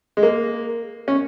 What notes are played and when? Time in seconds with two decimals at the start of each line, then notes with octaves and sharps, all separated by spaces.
0.17 G#3
0.23 A#3
1.08 C#4